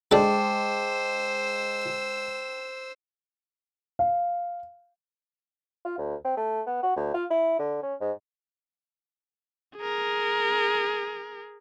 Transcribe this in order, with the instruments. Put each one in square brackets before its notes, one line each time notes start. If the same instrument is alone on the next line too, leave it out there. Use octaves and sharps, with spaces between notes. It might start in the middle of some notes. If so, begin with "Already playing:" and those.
[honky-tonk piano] G#3 [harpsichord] D4 A4 [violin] C5 E6 [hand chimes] G5 A5 D6
[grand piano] F5
[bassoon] F4
D2
C4
A3
B3
F#4
D2
F4
E4
D3
C#4
G#2
[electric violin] G#4 A#4